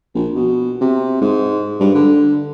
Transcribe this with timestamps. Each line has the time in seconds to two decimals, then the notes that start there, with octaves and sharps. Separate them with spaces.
0.15 A#1
0.35 B2
0.81 C3
1.21 G#2
1.80 G2
1.94 D3